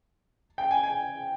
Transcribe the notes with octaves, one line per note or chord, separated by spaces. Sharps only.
G5
G#5
G#5